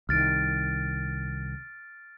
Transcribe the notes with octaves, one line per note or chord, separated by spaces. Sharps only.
C2 D#3 F6 A6 D7